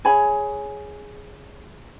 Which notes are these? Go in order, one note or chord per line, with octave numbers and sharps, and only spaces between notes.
G#4 C#5 G#5 B5